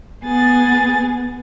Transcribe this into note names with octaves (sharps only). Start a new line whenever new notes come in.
B3 G#4 A6